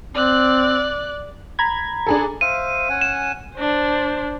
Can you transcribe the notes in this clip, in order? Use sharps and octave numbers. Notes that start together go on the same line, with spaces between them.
C4 D5 F#6
A#5 B5 G#6
D4 G#4 A4
C5 E5 F5 D#7
C#4 F#5 G#5
E7
D4 C5